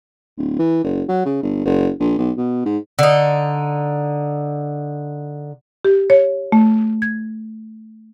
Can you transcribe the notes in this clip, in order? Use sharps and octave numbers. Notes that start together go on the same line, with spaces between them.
D1
E3
F#1
F#3
C#3
G1
F#1
A#1
B1
B2
G#2
D3 D#4
G4
C#5
A3
G#6